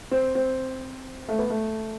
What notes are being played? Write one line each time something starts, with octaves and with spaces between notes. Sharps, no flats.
C4
C4
A3
B3
A3